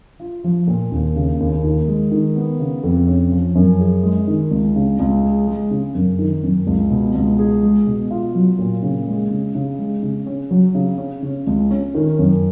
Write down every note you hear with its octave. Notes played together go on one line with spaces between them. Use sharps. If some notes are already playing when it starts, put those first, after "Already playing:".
F4
F3
A#2
D#2
C#3
D#2
D#3
G#3
D#3
B3
C#3
F2
C#4
F3
F#2
G#4
G#3
D#3
C#2
C#3
C#2
G#4
G#3
C#3
F#2
D#3
F#2
C#2
B2
C#2
G#4
G#3
B2
F4
F#3
A#2
C#3
G#3
C#3
C#3
G#3
C#3
C#4
F#3
C#3
C#4
C#3
C#2
C#4
D#3
F#2